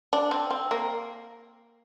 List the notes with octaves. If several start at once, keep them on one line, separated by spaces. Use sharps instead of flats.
D4
C4
C4
A#3